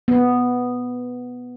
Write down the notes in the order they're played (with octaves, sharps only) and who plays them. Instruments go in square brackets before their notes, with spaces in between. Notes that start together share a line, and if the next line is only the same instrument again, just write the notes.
[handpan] B3